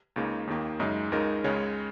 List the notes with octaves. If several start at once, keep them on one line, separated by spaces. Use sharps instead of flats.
C#2 C#3 A#3 D#4
D#2 D#3 A#3
F#2 C#3 G#3 D#4
C#2 C#3 G#3 D#4 A#4
C#2 C#3 G#3 C#4 C#5